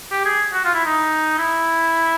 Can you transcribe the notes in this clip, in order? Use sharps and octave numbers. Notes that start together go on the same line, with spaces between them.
G4
G#4
F#4
F4
E4
D#4
E4